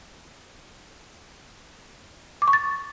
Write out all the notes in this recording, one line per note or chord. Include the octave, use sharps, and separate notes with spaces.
D6
C#6
A6